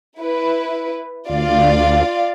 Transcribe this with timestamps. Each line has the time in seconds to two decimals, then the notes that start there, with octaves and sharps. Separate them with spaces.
0.18 E4 B4
1.30 D2 F4 D5 F5